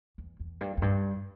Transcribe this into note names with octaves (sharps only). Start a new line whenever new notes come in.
E2
E2
G2
E2
G2